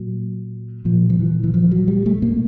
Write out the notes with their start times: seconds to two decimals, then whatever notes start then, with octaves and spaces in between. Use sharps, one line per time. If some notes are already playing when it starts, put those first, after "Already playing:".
Already playing: A#2 F#3
0.85 A#2 F3
1.10 F3
1.19 E3
1.44 E3
1.54 F3
1.71 F#3
1.88 G3
2.06 A3
2.22 B2 A#3